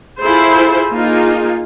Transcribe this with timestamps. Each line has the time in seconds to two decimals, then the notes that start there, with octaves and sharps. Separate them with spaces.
0.20 E4 F4 G#4 A4 C5
0.92 A#3 D#4 F4 G#4